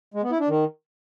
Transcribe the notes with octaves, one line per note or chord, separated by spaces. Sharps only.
G#3
B3
E4
D4
D#3